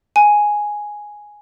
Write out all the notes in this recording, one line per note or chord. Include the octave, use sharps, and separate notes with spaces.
G#5